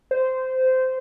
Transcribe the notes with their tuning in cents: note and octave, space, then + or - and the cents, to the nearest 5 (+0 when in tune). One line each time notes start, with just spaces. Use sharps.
C5 -15